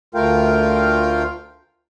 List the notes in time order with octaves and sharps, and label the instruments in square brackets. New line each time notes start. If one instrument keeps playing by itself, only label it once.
[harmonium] D2 A3 F4 A#4 F5 G5